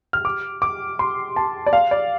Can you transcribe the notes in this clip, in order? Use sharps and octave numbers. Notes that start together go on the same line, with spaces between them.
F6
D6
D6
C6
A5
D5
F5
D5